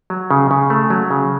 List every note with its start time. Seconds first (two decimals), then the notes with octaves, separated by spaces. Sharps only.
0.10 F#3
0.31 C#3
0.51 C#3
0.70 A3
0.90 F#3
1.10 C#3